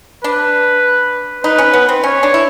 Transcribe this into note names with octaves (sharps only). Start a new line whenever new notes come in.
D4 B4
D#4 B4
C#4
B3
C4
C#4 C#5
D4
E4